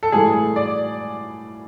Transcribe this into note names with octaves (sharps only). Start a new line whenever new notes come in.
A4
A2 E3 G3 G#4
D5